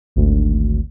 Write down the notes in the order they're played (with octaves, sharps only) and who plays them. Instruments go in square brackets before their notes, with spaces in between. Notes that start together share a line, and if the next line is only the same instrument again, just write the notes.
[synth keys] G#1 D2